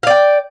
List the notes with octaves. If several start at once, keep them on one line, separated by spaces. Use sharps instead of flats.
D5 F5 G5